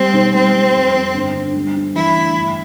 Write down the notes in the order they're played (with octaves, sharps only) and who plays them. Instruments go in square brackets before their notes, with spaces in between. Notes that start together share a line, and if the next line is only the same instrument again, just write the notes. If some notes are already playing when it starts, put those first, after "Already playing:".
Already playing: [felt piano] G3 [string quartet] C4
[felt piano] B1
[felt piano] G3 [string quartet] C4
[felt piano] G3
F2
F2
G1
D3
G3
D4
[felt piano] E3 [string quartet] E4
[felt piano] D2
G1